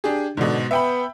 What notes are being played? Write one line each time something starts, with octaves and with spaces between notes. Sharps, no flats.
D4 G4 G#4
G#2 B2 D3
B3 E5 G5 B5